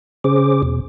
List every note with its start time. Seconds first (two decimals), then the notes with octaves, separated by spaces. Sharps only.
0.24 C#3 C#4 G#4 C5 D6
0.63 E2 B2